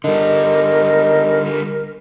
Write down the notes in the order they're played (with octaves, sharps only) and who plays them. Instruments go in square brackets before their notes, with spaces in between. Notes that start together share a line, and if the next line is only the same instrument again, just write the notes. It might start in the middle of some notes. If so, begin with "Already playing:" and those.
[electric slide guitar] D3 G3 [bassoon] D#4 [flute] A#4